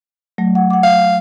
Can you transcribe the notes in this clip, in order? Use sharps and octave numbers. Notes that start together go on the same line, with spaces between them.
F#3 A3
F#5
F#5 D6
F5